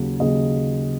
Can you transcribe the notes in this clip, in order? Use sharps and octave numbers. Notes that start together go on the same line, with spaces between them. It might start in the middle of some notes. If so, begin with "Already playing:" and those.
Already playing: D#2 C#3 F#3
D#2 C#3 F#3 D#5